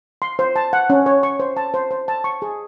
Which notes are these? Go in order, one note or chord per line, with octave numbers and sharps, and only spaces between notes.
C6
C5
A5
F#5
C#4
C#5
C#6
C5
A5
C5
C5
A5
C#6
G#4